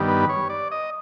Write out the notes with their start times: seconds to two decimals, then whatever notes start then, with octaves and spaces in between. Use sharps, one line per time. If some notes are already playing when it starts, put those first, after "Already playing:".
Already playing: G2 D#3 G3 B3
0.08 B4
0.29 C#5
0.50 D5
0.71 D#5